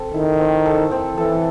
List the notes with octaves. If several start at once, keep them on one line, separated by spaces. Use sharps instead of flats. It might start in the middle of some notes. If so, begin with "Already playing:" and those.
Already playing: C4 A4
D#3 E4
C4
A4
C4
E3 A4